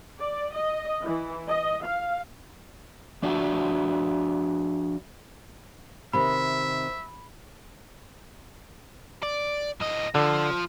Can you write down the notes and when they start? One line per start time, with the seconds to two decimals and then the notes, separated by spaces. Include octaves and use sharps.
0.20 D5
0.54 D#5
1.03 E3
1.49 D#5
1.85 F5
3.23 F3 D4 F#4 D5 E5
6.13 C3 D#3 E5 B5
9.23 D5
9.81 A2 D#5
10.15 D3 F3